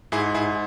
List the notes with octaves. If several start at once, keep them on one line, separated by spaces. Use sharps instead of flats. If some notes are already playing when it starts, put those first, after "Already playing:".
G#2 E4 G#4
G#2 E4 G#4